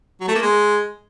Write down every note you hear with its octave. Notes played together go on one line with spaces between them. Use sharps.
F#3
A3
A#3
G#3